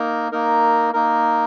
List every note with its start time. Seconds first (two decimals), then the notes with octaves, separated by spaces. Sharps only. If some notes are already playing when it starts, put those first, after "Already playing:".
Already playing: A#3 D#4 A#4
0.32 A#3 D#4 A#4
0.93 A#3 D#4 A#4